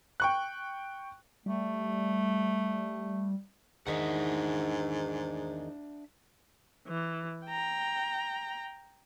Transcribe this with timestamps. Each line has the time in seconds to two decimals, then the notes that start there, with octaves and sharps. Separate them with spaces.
0.20 G5 C#6 F#6
1.46 G3 A3
3.87 E2 G#2 D#3 D4 D#4 E5 F#5
6.88 E3
7.47 G5 A#5